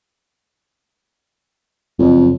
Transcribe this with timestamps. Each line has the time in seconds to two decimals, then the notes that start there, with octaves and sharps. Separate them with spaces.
1.99 F#1 F2